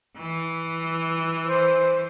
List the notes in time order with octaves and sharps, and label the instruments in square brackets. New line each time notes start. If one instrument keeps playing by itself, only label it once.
[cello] E3
[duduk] C5